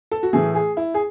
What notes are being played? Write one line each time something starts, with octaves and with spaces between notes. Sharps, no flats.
A4
F#4
A2 E3 A3 G#4
G#4
E4
G#4